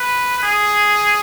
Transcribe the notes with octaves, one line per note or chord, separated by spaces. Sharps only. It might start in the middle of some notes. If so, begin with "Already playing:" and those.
Already playing: B4
G#4